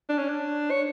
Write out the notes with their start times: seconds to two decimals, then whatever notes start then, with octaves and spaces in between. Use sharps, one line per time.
0.09 D4
0.19 C#4
0.29 D4
0.71 C#5